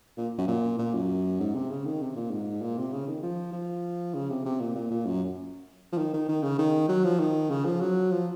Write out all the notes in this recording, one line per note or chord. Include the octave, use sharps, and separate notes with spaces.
A#2
F#2
A#2
A#2
F#2
G#2
C3
C#3
D#3
C3
A#2
G#2
A#2
C3
C#3
D#3
F3
F3
C#3
C3
C3
A#2
A#2
A#2
F#2
F3
D#3
D#3
D#3
C#3
D#3
F#3
F3
D#3
C#3
F3
F#3
F3